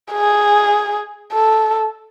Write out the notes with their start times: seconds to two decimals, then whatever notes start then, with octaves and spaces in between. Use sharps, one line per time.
0.12 G#4
1.33 A4